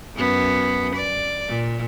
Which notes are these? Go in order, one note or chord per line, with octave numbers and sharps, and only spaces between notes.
F#2 B3
D5
A#2